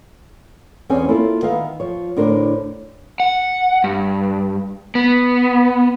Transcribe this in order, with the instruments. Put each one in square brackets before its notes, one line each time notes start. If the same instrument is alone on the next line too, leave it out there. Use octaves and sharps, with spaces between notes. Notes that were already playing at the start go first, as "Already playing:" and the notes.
[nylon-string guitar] E2 C4 C#4 G#4 D5 G#5
A#3 E4 F4 A4
D#3 B3 B4 E5 F5
F3 C#5
A2 D3 D4 A#4 C5
[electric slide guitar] F#5
G2
B3